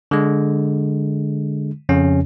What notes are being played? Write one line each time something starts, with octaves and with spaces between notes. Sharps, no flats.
D3 G#3
F2 C#3 C#4